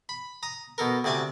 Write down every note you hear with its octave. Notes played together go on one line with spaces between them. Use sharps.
B5
A#5 D#6
B2 A4 A#4
D2 C3 D5 G#5 A5